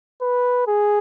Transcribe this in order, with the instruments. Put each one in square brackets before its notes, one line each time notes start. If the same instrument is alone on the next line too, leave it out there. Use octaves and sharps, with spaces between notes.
[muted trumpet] B4
G#4